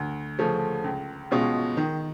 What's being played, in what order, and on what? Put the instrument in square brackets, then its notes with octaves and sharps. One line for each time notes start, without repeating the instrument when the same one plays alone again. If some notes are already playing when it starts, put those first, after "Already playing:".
Already playing: [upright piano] D2
C#3 F3 A3 C#4
C#2
B2 G#3 C#4 F4
D#3